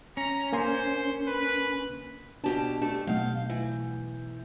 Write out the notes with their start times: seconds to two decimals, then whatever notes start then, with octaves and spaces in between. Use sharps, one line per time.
0.17 C#4 A#5
0.53 A#3 D4 A#4 C5 G#5 C6
1.28 B4
2.44 B2 D4 F#4 G4 A5
2.82 A3 D4 G4
3.07 B2 F#3 A3 F5 G6
3.50 E3